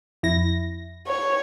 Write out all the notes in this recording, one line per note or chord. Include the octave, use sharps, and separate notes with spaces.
F2 E4 A#6
C#5